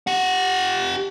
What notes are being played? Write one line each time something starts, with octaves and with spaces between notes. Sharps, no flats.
G4 F#5